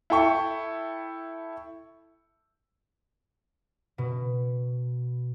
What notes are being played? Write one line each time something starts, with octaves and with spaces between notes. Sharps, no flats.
E4 A4 G5 C#6
B2